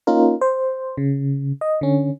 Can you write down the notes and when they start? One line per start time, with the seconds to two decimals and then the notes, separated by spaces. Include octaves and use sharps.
0.07 A#3 C#4 D#4 F4 A#4
0.41 C5
0.97 C#3
1.61 D#5
1.81 D3 C#4